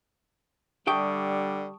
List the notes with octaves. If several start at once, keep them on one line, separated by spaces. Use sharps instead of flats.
D3 G3 G4 E5 G5 A5 C#6 D#6